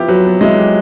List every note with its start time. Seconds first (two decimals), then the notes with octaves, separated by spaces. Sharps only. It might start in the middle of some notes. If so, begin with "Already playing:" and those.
Already playing: F3 B3 E4 G4
0.09 F#3 B4
0.25 B3
0.41 G#3 E4
0.58 G4